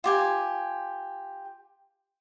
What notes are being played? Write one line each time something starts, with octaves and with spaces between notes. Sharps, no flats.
F4 G4 G#5